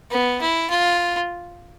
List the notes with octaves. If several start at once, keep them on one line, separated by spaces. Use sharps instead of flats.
B3
E4
F4